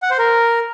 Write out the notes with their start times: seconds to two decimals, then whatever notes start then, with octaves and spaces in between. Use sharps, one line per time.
0.02 F#5
0.10 C5
0.18 A#4